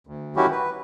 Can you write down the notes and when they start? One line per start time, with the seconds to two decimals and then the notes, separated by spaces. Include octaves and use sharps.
0.07 D2
0.36 D#3 F#3 C#4 E4 F#4 G4
0.52 B4